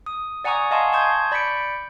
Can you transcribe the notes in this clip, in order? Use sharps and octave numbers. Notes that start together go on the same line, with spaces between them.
D#6
D5 F#5 G#5 A#5 C#6 D#6
D#5 F5 G#5 A5 C6 C#6
A5 C6 C#6 D#6 G6 G#6
D5 B5 G6 B6 C#7 D7